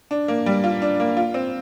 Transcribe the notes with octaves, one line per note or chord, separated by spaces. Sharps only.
D4
A#3
G3
F4
D4
A#3
F4
C4